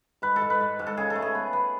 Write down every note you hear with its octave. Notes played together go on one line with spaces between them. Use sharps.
G#2 B4
A4
G#2
B4
G#2
G#2
A4
C#3 G#4
A4
A3
G#4
B3
B3